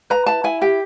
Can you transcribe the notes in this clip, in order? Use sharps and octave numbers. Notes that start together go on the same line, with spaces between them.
B4 A#5
E4 A5
E4 G#5
G4 G5